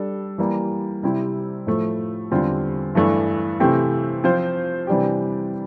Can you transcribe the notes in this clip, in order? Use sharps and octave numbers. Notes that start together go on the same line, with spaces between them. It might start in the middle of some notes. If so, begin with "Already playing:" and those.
Already playing: G3 D4 A4
E3 G3 A#3
C3 G3 C4 E4
A2 F3 A3
E2 D3 G3 C4 F4
G2 E3 A3 D4
C3 E3 A3 C4 G4
F3 C4 F4 C5
C3 E3 G3 D4 G4